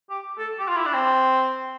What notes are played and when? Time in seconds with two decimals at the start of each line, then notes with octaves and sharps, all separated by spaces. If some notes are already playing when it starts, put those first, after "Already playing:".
0.10 G4
0.38 A4
0.59 G4
0.68 F4
0.77 E4
0.86 D4
0.94 C4